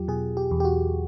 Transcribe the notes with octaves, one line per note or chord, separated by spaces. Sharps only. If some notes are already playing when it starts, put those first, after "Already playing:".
Already playing: E2 F#3 F4 G4
B2 G#4
G4
E2
G4
F#4